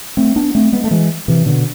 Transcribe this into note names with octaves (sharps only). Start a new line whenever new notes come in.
A3 C4
B3 D4
A3 C4
G#3 B3
A3
E3 G#3
C3 E3
B2 D3